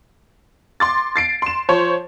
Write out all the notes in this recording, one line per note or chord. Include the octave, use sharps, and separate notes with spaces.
C6 D6 A6
A6 C7 D7
C6 E7
F3 C5 C#5